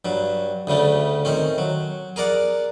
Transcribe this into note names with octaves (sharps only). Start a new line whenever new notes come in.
G2 F#3
D2 C#3 G3 A3
D#3 C4 C#4
F#3
G#4 A#4 D5 F#5